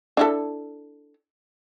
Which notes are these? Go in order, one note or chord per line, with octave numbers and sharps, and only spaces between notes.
D4 E4 A4